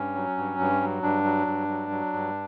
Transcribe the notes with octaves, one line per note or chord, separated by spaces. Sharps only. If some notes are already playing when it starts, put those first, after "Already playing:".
Already playing: G2 C#4
F#3
G2
G2
F#3
G2 D4
F#3
G2
F#3
F#3
G2